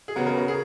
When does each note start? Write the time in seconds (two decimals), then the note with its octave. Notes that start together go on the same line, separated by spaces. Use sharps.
0.08 G#4
0.16 C#3 F#3 B3 A#4
0.27 A#4
0.38 A#4
0.48 G#4